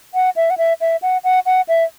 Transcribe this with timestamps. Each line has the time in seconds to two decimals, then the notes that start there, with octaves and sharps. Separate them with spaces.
0.14 F#5
0.36 E5
0.50 F#5
0.58 E5
0.81 E5
1.02 F#5
1.24 F#5
1.46 F#5
1.68 E5